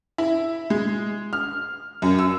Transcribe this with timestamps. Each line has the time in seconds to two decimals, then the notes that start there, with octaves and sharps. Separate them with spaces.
0.18 E4
0.70 G#3
1.33 F6
2.02 F#2
2.19 E6